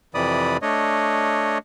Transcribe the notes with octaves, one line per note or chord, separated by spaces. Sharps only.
F2 C3 E3 D5 B5 D#6
A3 D4 C#5 D#5